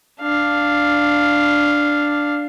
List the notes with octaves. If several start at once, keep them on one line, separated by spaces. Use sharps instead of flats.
D4 F5